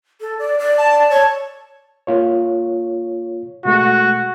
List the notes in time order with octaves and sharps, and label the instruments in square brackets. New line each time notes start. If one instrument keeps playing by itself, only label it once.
[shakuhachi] A4
D5
D5
[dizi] A5
[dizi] C#5 [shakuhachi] A5
[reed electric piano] A#3 F4 C#5
[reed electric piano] B2 G#3 A3 [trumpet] F#4